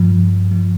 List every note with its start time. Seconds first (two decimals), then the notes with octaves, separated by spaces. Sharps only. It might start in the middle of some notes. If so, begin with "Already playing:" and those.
Already playing: G2 F3
0.51 F3